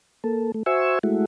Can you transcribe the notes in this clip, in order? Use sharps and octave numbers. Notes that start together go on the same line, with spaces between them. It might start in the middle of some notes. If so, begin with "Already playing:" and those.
A#3 A4
A3
F#4 C5 E5 G#5 C#6 E6
G#3 A3 E4 F#4